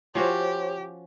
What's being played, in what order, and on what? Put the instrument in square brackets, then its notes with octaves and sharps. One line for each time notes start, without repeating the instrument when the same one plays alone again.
[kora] F3 C#4 F#4 [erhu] G4 [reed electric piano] C5 C#5